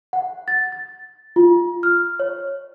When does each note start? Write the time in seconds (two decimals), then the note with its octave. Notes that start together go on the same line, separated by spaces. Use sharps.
0.13 F#5
0.48 A6
0.72 A6
1.36 F4
1.83 F6
2.20 C#5